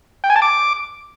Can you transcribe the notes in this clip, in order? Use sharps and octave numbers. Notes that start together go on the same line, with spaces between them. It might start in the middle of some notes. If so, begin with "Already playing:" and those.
G5
G#5
A5
D6